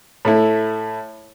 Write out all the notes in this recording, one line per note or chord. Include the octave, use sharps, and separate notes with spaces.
A2 A3 E4